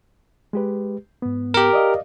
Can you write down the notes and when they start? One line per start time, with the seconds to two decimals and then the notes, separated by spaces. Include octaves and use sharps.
0.53 G#3 G4 B4
1.22 G#2 B3
1.54 G4 A#4
1.73 D5 D#5 F5